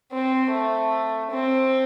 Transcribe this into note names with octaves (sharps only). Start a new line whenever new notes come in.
C4
A3
C4